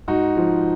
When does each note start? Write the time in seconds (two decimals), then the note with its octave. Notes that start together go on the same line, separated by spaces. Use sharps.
0.08 G#2 D#4 F#4
0.37 F3